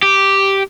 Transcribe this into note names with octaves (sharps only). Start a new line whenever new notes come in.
G4